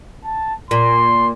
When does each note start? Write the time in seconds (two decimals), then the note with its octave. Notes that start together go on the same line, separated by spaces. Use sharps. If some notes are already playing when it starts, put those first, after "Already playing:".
0.24 A5
0.71 A#2 C6